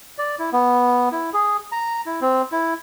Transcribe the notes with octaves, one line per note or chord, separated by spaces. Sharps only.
D5
E4
B3
E4
G#4
A#5
E4
C4
E4